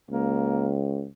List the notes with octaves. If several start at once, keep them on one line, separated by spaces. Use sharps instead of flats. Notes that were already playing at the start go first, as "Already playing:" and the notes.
C#2 A#3